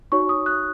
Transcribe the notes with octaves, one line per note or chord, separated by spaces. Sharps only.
D#4 F#4 C#5 C#6
D#6
F#6